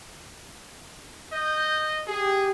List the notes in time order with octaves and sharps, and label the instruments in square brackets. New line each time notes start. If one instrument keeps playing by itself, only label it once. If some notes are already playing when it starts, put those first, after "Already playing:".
[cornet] D#5 [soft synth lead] G6
[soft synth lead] G4 [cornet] G#4